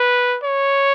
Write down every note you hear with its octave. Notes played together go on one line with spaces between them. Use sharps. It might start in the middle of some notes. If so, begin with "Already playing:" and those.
Already playing: B4
C#5